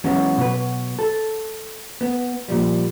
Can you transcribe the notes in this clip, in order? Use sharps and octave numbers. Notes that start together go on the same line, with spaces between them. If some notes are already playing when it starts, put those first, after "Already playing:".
E3 F#3 G#3 B3 C#4
B2 F#3 B4
A4
B3
A#2 F3 G3